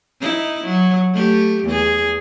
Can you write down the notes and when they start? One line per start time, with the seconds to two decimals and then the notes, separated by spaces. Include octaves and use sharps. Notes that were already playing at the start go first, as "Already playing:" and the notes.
0.21 D#4 E4
0.64 F#3
1.13 A3 G4
1.64 E2 G#4